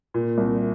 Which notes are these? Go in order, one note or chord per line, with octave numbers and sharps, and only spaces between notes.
A#2
C2